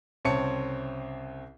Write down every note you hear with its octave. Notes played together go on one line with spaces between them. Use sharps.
C2 C#3 C4 C#5 A5 C#7